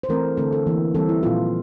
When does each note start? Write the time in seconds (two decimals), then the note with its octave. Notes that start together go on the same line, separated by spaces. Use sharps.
0.03 C5
0.09 E3 A3 C4 A#4
0.37 D3 A3 C4 A4
0.53 A4
0.67 E3 A#3
0.95 E3 G3 C4 A4
1.09 E4
1.23 A#2 F3 C4 F4